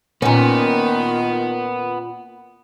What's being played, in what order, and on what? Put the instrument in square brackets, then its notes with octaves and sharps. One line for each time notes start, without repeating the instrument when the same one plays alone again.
[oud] A#2 C#4 [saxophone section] D#3 [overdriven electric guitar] B3